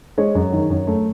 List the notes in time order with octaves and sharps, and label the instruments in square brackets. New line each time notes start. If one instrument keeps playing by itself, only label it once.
[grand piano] G#3 C#5
F#2
D#3
F#2
A3